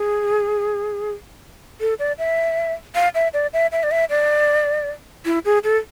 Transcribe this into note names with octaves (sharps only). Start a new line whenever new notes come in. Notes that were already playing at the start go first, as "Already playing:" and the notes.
Already playing: G#4
A4
D5
E5
F5
E5
D5
E5
E5
D5
E5
D5
E4
G#4
A4